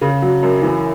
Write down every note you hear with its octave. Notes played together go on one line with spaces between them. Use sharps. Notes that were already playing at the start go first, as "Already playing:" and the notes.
C#3
F#3
F#2
E3